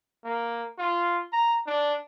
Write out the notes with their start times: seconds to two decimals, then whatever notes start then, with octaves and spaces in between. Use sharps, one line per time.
0.25 A#3
0.79 F4
1.33 A#5
1.67 D4